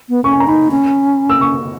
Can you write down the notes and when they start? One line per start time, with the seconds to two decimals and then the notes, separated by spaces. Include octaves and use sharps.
0.09 B3
0.24 C#4 C#6
0.33 G#5
0.40 A#5
0.47 D#4 B5
0.71 C#4
1.30 E6
1.41 C#6